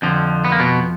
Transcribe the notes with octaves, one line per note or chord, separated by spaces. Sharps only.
F2 D3 F3
B3
A#3
B2 B3